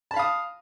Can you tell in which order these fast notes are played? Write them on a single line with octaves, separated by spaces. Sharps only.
A5 B5 F5 D#6